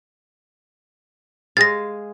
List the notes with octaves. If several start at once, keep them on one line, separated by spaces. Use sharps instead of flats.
G#3 G#4 F5 A6 A#6